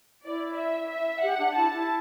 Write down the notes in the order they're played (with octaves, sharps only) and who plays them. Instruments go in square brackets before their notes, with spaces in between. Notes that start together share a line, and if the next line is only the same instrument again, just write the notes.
[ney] E4 [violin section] D5
[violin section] E5
E5
[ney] G4 [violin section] F#5
[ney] D4
[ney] E4 [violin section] A5
[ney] E4